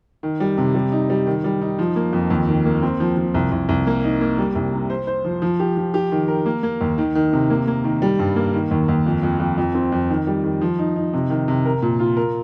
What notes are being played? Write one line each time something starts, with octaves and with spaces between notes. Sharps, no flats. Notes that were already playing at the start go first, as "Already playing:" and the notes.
D#3
G3
C3
G3
D#4
G3
D#3
G3
D#4
F3
A#3
F2
D#2
D#3
A#3
C4
F3
F3
C2
C2
C2
A#3
D#4
A#3
G3
C2
C3
C5
C5
F3
F3
G4
F3
G4
D#3
A#4
A#3
A#3
D#2
D#3
D#3
C3
A#3
A#3
D#3
G3
G2
A#3
D#3
D#2
D#2
F2
F2
F2
F2
C4
F2
D#3
G3
D#3
F3
D#4
D#4
C3
D#3
C3
A#4
A#2
F4
A#4